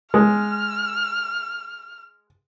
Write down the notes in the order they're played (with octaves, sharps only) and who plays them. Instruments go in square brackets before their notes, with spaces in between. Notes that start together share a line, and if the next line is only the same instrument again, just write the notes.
[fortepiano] G#3 [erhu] F6